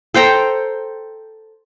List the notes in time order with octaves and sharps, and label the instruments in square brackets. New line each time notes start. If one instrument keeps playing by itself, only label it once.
[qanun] A4 C5 G5 A#5